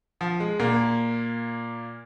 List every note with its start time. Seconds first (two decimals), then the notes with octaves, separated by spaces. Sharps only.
0.21 F3
0.40 G#3
0.59 A#2 A#3